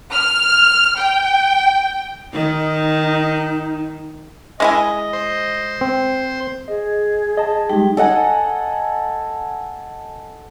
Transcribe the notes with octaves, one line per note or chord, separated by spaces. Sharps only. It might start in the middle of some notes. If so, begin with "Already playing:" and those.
F6
G5
D#3 D#4
G#3 E4 D#5 G#5
C5
C4
G#4 D#5
D#5 A5
G3 G#3 D#4 G4 G5
A4 D#5 F#5 G#5